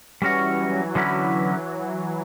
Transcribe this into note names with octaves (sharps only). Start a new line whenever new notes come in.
E3 G3 C#4 F#4 C#5
F#3
D3 F#3 C#4 E4 B4